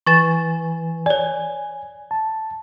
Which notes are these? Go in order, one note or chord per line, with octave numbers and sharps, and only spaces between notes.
E3 B4 G#5 C#6 A6 E7
C#5 D5 G#5
A5